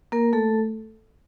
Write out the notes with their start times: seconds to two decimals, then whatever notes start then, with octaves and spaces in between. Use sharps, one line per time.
0.12 A#3 A#4
0.33 A3 A4